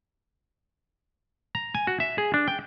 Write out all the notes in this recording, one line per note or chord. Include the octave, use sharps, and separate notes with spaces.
A#5
G#5
F#4
E5
G#4
D4
G5